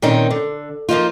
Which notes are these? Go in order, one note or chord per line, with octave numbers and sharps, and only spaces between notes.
A#2 D#3 C4 C#4 D#4
D3
F3 A#3 D#4 F4